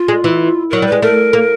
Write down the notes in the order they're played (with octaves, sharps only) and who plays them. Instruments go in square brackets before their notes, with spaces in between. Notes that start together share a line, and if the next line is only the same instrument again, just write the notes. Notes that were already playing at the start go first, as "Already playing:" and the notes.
Already playing: [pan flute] F4
[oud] G#3
E3
[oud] F#3 [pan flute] A#4
[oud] G3 [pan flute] B4
[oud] G#3
[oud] A3 [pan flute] A#4
[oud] A#3